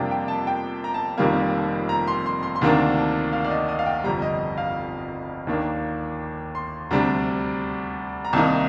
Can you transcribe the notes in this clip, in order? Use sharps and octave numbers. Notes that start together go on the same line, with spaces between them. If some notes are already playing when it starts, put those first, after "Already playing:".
Already playing: F2 C3 G3 A#3 D4 G5 A5
G5
A5
G5
A#5
A5
F1 F2 D#3 G3 A#3
A#5
C6
C6
C6
C6
D2 C3 D#3 A#3 D4 A#5
A5
F5
D5
D#5
D#5
F5
G5
G1 F2 C3 G3 A#5
D#5
F5
D#2 D#3 A#3 D4
C6
D2 C3 G3 D4 A#5
A#5
C2 C3 D#3 A#3 D#4 A5